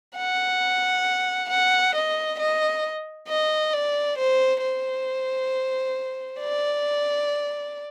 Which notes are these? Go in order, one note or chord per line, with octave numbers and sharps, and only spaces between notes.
F#5
F#5
D#5
D#5
D#5
D5
C5
C5
D5